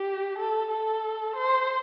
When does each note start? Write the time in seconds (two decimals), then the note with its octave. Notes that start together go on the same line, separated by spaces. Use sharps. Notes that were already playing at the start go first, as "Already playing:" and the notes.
Already playing: G4
0.39 A4
0.71 A4
1.36 C5